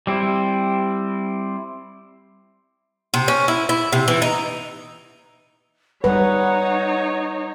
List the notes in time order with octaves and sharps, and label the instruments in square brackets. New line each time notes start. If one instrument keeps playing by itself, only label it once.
[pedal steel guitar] G3 C4 E4
[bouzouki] C3
C#4
E4
E4
C3
E3
D#4
[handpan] G3 B4 [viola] D#4 C#5 [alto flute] F#5